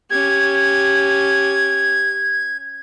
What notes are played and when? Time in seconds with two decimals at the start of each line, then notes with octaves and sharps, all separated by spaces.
0.10 C#4 G4 G#6